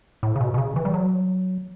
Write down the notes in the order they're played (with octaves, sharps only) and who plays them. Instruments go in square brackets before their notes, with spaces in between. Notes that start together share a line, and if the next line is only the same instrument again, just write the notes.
[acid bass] A2
C#3
B2
B2
C#3
E3
G3
F#3